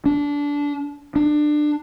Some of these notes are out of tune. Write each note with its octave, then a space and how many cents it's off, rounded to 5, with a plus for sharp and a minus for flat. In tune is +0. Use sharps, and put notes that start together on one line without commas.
D4 -20
D4 +25